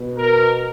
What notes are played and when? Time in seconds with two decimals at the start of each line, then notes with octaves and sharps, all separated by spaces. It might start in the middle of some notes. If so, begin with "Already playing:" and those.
Already playing: B2
0.18 A#4